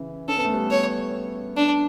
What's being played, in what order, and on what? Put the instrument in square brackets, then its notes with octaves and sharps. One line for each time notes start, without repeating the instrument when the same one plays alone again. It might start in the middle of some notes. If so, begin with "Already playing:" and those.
Already playing: [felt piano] C#3 E3
[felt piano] C#4 [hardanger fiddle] A4
[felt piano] B3
A3
G3 B3
[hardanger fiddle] C#5
D4